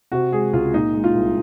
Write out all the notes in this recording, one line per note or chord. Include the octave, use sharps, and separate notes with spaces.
C3 F#4
G#3 G#4
C#2 F4
A#2 D#4
G#3
F4
C2